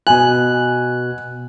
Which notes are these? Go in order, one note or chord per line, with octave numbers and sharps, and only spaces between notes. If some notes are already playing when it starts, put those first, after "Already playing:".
B2 G#5 F#6